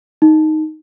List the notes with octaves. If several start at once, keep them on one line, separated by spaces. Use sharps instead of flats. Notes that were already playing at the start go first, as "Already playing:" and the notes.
D#4